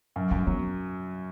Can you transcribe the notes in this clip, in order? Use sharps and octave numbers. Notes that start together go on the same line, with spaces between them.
F#2
F#2 F#3
F#3 B3